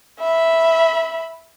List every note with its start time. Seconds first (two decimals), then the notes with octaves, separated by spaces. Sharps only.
0.20 E5 B5